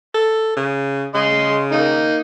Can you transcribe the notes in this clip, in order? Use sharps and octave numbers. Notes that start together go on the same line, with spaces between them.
A4
C#3
C#3 D#5 C6 D#6
A#3 D#4